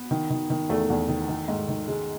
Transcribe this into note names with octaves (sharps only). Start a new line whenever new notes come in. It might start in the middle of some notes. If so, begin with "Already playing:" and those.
Already playing: B3
D#3
D#3
D#3
E2 A3
E2
D#3
D#3
G#2
D#3
D#3 G#3